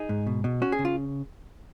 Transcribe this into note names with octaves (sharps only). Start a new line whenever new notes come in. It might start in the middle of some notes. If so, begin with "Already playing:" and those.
Already playing: D#4 G#4
G#2
B2
B2
C#4 F#4
G#4
C#3
F4